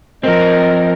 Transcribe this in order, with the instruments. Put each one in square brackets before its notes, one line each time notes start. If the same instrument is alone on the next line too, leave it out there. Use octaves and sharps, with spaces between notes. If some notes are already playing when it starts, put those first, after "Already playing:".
[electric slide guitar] F3 C4 [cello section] A#4 [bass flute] D#5